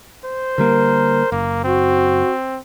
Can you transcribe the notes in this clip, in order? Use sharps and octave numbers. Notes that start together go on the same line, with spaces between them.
C5
D3 G3 A#3 A#4
F#1 A#3
C4 F#4